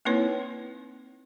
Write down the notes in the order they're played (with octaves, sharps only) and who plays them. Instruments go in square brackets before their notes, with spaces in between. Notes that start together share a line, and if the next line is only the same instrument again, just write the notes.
[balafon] A#3 C4 D#4 E4 B4 C#5